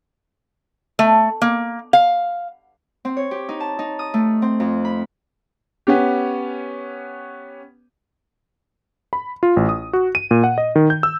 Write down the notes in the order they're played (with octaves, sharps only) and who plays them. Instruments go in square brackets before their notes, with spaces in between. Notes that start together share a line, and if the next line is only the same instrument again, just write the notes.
[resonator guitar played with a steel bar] A3
A#3
F5
[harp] C4
C#5
G4
D#4
A5
D#4
D#6
A3
C4
F2
B5
[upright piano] B3 C#4 G4
[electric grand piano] B5
F4
A1
D#6
F#4
D#7
A#2
F#5
D#5
D#3
G6
E6